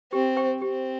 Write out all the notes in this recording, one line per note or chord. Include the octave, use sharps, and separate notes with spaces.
C4 G4
C5 G5 C#6
C4 G4